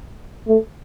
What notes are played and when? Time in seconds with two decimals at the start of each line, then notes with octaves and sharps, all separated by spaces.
0.48 A3